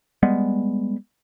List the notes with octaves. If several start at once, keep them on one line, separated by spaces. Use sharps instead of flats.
G3 G#3 B3